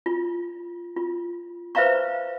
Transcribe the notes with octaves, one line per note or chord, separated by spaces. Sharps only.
F4
F4
B4 C5 E5 F5 A#5 C#6